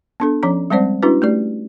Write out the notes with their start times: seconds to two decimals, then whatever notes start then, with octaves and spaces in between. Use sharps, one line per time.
0.20 B3 D4 A4
0.43 F3 C#4 C#5 A#5
0.70 G3 G#3 C4 C5 D5
1.02 C#4 D4 E4 F#4 B4
1.22 A3 G4 D5